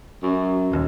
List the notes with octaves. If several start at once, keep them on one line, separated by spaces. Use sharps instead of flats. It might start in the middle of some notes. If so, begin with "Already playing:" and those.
F#2
D#1 D#2